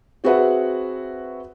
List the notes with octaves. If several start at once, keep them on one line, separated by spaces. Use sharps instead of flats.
C4 F#4 G#4 B4 E5 F#5